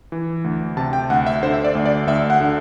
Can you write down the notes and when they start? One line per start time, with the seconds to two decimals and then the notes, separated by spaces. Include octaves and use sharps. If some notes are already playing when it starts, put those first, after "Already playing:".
0.12 E3
0.44 D2
0.77 C3 A5
0.93 G5
1.10 D2 F#5
1.27 E5
1.43 D3 C5
1.54 E5
1.65 D5
1.75 D2
1.85 D5
2.07 D2 E5
2.30 F#5
2.40 D3